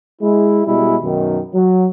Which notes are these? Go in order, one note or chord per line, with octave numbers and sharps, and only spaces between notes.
G#3 E4
B2 G3 G#3 E4
F#2 B2 D#3
F#3